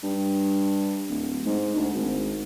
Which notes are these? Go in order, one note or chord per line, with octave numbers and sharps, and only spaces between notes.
G2
D1
G#2
D2
G#1